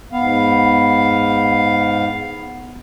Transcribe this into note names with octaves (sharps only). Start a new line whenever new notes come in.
G#2 B3 F5